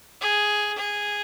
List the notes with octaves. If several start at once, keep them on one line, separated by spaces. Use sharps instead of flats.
G#4
G#4